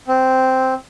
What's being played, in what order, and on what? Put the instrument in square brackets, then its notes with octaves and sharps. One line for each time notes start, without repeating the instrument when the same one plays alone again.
[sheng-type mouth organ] C4